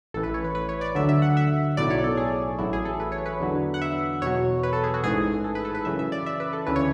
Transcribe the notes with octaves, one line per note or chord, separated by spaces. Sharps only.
A1 A2 E3 A4
B4
C#5
B4
B4
C#5
D5
D2 D3 F#3 E5
E5
F#5
E5
B1 A2 F#3 D5
C#5
A4
G#4
A1 A2 F#3 E4
G#4
A4
B4
C#5
B4
E2 D3 F#3
F#5
E5
E2 B2 F#3 C#5
B4
A4
G#4
F#4
A1 G#2 E3 G#4
A4
B4
A4
B4
F#2 C#3 E3 E5
E5
D5
E5
B4
A4
D2 C#3 E3 B4
C#5